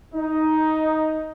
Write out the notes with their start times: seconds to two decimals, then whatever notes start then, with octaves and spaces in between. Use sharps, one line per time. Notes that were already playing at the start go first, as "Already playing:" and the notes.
0.13 D#4